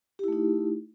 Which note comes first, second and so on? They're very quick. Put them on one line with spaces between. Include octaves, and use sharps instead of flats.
G4 E4 A3 D#4